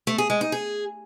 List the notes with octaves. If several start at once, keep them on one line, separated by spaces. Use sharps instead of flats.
A3
G#4
G#3
D#4
G#4